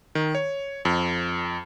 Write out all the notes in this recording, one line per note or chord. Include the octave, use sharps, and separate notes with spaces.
D#3
C#5
F2